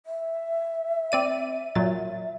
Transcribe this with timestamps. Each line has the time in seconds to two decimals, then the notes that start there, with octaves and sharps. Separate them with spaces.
0.06 E5
1.12 C4 D5 D#7
1.75 A#2 F#3 A6